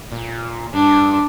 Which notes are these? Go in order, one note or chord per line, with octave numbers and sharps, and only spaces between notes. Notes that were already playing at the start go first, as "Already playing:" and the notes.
A#2
G2 D4